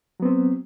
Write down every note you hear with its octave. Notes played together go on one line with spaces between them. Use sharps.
F#3 B3 C4